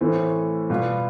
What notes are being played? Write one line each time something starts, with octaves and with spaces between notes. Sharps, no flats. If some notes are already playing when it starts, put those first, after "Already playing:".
A2 E3 A3 C4
B2 G3 B3 F4